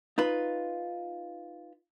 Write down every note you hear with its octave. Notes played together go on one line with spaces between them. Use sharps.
D#4 F4 B4